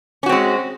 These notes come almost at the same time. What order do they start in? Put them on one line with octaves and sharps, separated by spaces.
C#4 F#4 C4 G#3